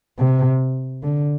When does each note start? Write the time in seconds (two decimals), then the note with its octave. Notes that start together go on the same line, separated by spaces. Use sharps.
0.18 C3
1.03 D3